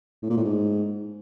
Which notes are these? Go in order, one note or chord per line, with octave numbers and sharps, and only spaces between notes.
A2
A#2
A2
G#2